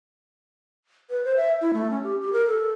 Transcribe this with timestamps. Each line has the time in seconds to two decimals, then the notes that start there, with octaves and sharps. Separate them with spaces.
1.10 B4
1.25 C5
1.37 E5
1.61 E4
1.74 A3
1.91 C#4
2.03 G4
2.21 G4
2.33 A#4
2.47 A4